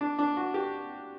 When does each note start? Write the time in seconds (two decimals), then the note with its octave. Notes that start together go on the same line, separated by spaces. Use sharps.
0.01 D4
0.19 D4
0.37 F#4
0.54 G4